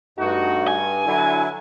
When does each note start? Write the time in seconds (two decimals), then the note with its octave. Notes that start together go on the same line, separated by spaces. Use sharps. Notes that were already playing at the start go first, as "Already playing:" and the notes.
0.18 G2 A3 D#4 F#4
0.68 G#5
1.06 D3 F#3 E4